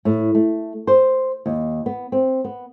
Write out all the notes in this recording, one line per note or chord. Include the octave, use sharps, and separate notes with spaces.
A2
A3
C5
D#2
B3
C4
B3